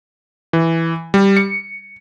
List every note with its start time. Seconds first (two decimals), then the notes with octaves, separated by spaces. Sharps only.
0.53 E3
1.14 G3
1.37 C#7